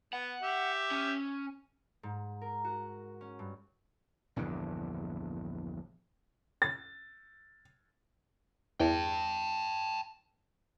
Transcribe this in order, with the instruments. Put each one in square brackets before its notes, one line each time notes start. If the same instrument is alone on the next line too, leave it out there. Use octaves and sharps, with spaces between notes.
[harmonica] B3 [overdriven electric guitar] F#5
[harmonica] G4 E5
[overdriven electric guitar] C#4
[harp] G#2
A#4
F#4
C#4
G2
[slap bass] A#1 E2 G2 D3
[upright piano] A6
[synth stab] E2 [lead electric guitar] G5 A5